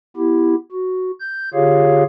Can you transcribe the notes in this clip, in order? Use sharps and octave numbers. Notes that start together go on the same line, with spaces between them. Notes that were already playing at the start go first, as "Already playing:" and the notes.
B3 E4 G4
F#4
G6
D3 F4 G4 G#4 C#5 F5